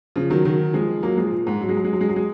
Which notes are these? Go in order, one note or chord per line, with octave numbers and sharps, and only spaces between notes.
C#3 F3
D#3 F#3
D#3 F#3
F3 G#3
F#3 A#3
F3 G#3
A#2
G#2
F#3
G#3
F#3
G#3
F#3
G#3
F#3
G#3